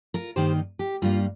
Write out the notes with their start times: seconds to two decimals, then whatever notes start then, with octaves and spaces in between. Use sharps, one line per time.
0.14 F4 A#4
0.36 G2 D#3 A#3 D#4 G4 C5
0.79 G4
1.02 G2 G3 A#3 F4